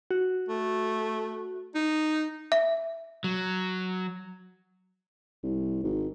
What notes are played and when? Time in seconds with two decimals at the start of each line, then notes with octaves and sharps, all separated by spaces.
0.11 F#4
0.49 A3
1.75 D#4
2.52 E5
3.24 F#3
5.43 C2
5.83 G#1